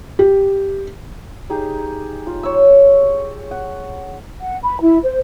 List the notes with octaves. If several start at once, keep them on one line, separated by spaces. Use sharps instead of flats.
G4
D#4 G4 G#4
F4
C#5 E6
F#5
F#5
B5
E4
C5